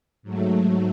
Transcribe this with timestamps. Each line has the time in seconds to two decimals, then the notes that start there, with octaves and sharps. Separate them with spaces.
0.23 G#2 F#3 A3